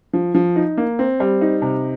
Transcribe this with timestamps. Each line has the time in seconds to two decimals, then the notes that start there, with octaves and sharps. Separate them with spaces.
0.13 F3
0.34 F3
0.56 D#4
0.77 A#3
0.99 C4
1.20 G3
1.41 D#4
1.62 C3